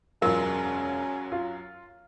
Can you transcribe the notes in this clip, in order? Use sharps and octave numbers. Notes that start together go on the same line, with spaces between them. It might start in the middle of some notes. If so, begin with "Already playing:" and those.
E1 F#2 F#3 C#4 F4 A#4
F4